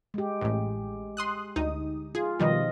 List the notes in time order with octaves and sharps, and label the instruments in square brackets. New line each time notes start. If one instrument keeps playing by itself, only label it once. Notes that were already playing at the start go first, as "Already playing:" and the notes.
[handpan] G#3 G4
[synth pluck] A1 A2
C6 D#6 F#6
D2 D#4 D#6
[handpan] F4 [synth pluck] G#4
[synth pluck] B2 D#3 G3 [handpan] F3 D#5